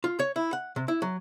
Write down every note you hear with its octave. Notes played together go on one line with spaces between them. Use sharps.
F4
C#5
E4
F#5
C3
E4
F#3